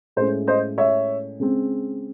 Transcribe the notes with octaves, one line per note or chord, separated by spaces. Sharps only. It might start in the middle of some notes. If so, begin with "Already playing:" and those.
A2 G#3 C#4 C5
C5 D#5
C#5 E5
C#3 G#3 C4